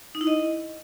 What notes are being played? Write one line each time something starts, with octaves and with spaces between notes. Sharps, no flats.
D#4
E4
D#5